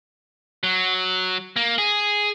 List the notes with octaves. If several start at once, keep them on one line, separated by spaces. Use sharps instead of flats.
F#3
A#3
G#4